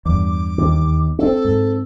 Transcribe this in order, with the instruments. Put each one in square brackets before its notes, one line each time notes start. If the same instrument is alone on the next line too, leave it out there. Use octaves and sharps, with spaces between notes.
[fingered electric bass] E2 G2 [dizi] D6
[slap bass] D#2
[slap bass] C4 C#4 [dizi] A4
[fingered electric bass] G#2